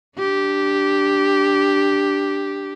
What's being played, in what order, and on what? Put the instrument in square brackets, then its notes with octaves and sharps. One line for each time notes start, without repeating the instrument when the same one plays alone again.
[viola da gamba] D4 G4